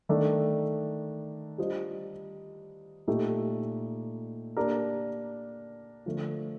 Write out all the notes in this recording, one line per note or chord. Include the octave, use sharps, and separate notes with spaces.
D#3 A3 D4 A4
G3 D4 F4 C5 D#5
A#2 A3 D#4 G4
A#3 D4 G4 A#4
D3 F3 A3